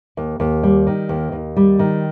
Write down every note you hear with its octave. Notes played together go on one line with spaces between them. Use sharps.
D#2
D#2
G3
D#3
D#2
D#2
G3
D#3